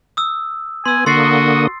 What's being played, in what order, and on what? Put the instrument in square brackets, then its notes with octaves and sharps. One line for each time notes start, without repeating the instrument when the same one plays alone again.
[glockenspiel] D#6 E6
[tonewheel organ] B3 [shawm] G#5 [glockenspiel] C6 E6
[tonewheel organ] D3 A#3 D#6 [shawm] F#4 [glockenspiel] C6 A6 C7